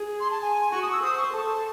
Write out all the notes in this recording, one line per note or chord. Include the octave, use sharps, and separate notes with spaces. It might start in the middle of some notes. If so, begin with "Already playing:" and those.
Already playing: G#4
C6
A5
G#5
F#4 C#6
D#6
E6
C5 D#6
C#6
A4 A5